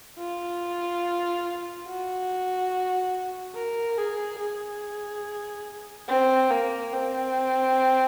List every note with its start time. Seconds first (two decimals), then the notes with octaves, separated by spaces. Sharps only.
0.19 F4
1.87 F#4
3.55 A#4
3.98 G#4
4.40 G#4
6.08 C4
6.50 A#3
6.93 C4